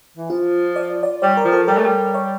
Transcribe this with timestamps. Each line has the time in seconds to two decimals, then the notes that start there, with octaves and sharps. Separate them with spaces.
0.17 E3
0.30 F3 F4
0.76 D5
1.03 D5
1.22 G3 C#5
1.37 A#4
1.45 F3
1.52 A4
1.68 G3 A#4
1.78 A3
1.86 G3
2.14 C#5